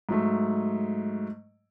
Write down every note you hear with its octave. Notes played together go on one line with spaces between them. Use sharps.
G#2 F#3 A3